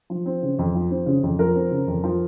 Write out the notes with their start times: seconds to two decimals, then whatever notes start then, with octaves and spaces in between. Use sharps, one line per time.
0.10 F3
0.26 C4
0.43 C#3
0.59 F2
0.75 F3
0.90 C4
1.06 C#3
1.23 F2
1.39 F3 A#4
1.55 C4
1.71 C#3
1.87 F2
2.04 F3